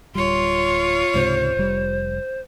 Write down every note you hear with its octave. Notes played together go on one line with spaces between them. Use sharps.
D1 G3 F4 C#5 C6
C#2 G#2 C3 C5
F1 G3